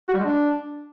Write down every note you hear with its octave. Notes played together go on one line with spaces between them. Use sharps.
F#4
G3
G#3
D4